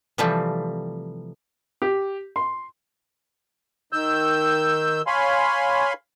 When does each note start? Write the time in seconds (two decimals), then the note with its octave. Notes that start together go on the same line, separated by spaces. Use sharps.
0.18 C3 E3 F3 G3 A3 C4
1.82 G4
2.36 C6
3.93 D#3 E6 G6
5.07 C#5 F5 G#5 B5 C6